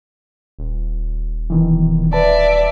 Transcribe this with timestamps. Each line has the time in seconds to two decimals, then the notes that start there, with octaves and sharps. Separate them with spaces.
0.59 D#1
1.50 B2 D#3 E3
2.13 B4 D5 E5 A5